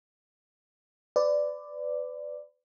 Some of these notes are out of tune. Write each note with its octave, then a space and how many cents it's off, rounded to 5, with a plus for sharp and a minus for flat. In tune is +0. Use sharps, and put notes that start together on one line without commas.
B4 +30 D5 +0